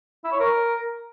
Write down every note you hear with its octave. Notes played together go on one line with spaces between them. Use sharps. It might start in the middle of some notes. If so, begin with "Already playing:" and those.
E4
C#5
A#4